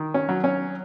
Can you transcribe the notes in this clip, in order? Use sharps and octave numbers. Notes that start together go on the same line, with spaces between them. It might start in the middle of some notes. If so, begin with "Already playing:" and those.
Already playing: D#3
C#4
F#3
C#4